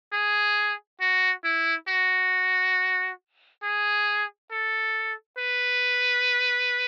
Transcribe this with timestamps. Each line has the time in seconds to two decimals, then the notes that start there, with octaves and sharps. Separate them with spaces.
0.12 G#4
1.01 F#4
1.44 E4
1.88 F#4
3.63 G#4
4.51 A4
5.38 B4